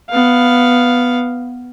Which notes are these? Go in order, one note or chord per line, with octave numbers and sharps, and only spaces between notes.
B3 F5